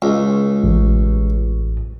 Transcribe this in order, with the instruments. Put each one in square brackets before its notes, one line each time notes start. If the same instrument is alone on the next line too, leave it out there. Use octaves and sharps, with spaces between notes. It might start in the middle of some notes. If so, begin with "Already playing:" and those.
[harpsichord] C#2
[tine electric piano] A1